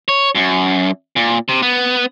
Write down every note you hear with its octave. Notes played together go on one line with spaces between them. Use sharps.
C#5
F#2
A#2
C3
B3